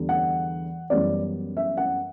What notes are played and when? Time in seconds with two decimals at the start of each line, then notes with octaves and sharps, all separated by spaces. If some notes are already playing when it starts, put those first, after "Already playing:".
Already playing: E2 D3 G3 B3
0.09 F#5
0.90 F#2 E3 G3 B3 D5
1.57 E5
1.77 F#5